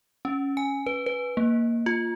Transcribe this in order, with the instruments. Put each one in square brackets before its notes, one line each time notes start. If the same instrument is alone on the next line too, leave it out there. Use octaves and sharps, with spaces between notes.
[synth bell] C#4
G#5
B4
B4
A#3
F4